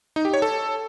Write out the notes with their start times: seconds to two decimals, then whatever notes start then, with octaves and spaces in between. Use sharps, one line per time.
0.16 D#4
0.25 G4
0.34 C#5
0.42 A4